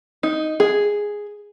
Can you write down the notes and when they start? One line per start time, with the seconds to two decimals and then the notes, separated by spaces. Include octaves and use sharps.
0.23 D#4
0.60 G#4